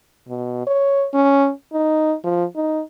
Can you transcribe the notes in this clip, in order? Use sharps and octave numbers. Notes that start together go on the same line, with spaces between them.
B2
C#5
C#4
D#4
F3
D#4